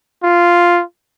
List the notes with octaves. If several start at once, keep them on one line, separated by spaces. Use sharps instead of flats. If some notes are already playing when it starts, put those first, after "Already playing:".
F4